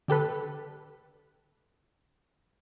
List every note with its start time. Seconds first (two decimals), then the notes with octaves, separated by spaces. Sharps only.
0.08 D3 G4 A4 B4